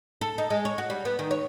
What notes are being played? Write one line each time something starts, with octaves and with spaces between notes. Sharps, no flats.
A4
D#4
G#3
C#5
F#4
G3
B3
D#3
C#5